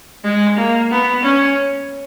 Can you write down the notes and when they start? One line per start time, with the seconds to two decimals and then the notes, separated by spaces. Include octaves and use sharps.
0.24 G#3
0.57 A#3
0.90 B3
1.23 C#4